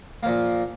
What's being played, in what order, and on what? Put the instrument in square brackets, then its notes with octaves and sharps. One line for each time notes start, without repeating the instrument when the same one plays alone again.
[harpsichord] A#2 F3 A#3